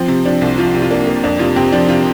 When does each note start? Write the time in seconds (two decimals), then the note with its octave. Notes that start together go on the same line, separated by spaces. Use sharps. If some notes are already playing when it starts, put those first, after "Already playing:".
Already playing: F3 C4
0.08 C3
0.25 F3 D4
0.41 C2
0.58 F3 F4
0.74 C3
0.82 F4
0.91 A#3 D4
1.07 A#3
1.24 F2 D4
1.39 C3 F4
1.56 C3 C4
1.72 F3 D4
1.89 C3 F4